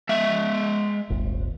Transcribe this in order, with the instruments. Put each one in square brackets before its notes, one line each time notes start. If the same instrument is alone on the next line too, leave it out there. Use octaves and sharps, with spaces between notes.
[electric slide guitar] G#3 E5
[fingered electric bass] D#1 G#1